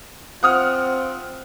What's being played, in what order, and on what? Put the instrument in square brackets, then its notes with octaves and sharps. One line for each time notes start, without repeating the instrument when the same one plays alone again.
[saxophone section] C4 F4 [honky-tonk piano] F#5 D#6 F6